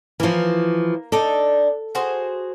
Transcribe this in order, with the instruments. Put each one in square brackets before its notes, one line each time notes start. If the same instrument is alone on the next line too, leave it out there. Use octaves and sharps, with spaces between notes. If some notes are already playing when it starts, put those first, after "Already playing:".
[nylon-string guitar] E3 F3 [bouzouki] A#3 A#4
[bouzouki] D4 D#4 D5 [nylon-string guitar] A4
[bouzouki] F#4 G#4 C5